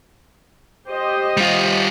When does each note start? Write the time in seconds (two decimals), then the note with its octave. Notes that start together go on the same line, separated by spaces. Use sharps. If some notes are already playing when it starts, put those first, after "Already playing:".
0.89 G4 C5 D#5
1.37 G3 F4